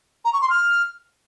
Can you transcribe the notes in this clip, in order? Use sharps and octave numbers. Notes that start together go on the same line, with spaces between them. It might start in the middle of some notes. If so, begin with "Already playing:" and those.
A#5
C#6
C6
F6